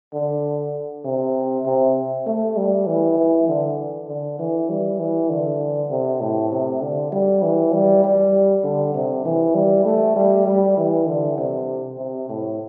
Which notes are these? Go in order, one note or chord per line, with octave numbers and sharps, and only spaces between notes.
D3
C3
C3
A3
G3
E3
E3
D3
D3
E3
G3
E3
D3
C3
A2
C3
D3
G3
E3
G3
G3
D3
C3
E3
G3
A3
G3
G3
E3
D3
C3
C3
A2